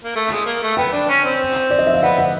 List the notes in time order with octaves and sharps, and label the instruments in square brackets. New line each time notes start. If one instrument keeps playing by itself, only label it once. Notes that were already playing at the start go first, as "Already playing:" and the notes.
[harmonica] A#3
A3
G#3
A#3
A3
[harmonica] B3 [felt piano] G5
[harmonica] D4
C#4
C4
[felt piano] D5
D#5
E5
F5
[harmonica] B3 [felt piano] F#5
[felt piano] F#5